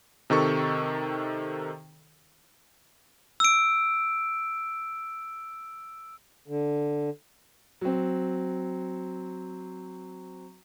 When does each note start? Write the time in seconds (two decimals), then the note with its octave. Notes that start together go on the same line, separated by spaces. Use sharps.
0.30 C3 D#3 A4 C#6
3.40 E6 D7
6.48 D3
7.81 F#3 C4